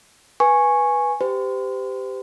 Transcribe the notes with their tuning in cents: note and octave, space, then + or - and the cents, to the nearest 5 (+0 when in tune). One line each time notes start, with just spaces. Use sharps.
B4 -10 G#5 +0 C#6 -10
G4 +0 C5 -35